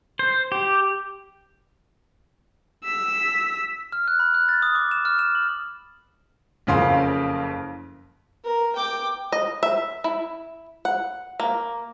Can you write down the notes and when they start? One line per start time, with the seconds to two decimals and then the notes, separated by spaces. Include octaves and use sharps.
0.19 C5
0.52 G4
2.84 E6 B6
3.92 F6
4.08 F#6
4.20 B5
4.34 F#6
4.49 A6
4.62 D#6
4.75 D6
4.91 E7
5.05 F6
5.19 E7
5.35 F#7
6.67 F#1 F2 C#3 F5 C6
8.44 A#4
8.76 G5 D6
9.32 D#5
9.63 E5
10.04 E4
10.85 F#5
11.40 A#3